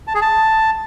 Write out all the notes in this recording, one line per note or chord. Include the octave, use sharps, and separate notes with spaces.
A5
G#4
A5